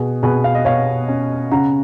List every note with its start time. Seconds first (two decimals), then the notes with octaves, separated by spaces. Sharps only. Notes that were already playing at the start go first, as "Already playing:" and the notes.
Already playing: B2 G#4
0.23 B2 G#4 B4
0.44 F5
0.55 D#5
0.65 B2 C#5 F5
1.08 C#4
1.51 C#3 F#5 A#5